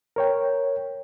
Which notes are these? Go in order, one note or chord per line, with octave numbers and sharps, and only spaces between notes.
A#4 C#5 G5